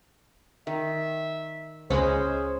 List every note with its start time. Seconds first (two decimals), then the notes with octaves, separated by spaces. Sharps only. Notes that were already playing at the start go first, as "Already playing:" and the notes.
0.67 D#3 E5
1.90 C#2 G#3 C#4 G#4 C5 B5 C#6